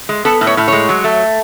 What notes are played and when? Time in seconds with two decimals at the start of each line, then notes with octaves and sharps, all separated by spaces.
0.09 G#3
0.25 B3 A4
0.41 A2
0.47 C#5
0.57 A2
0.68 G#3 C#5
0.89 F#3
1.04 A3